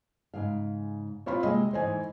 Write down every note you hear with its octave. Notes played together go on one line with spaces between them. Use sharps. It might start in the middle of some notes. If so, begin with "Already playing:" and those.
G#2 C#3 F5
C4 E4 F4 C#5 B5
C3 G#3 A#3 D#5
G#2 E3 A3 C5 D#5 G#5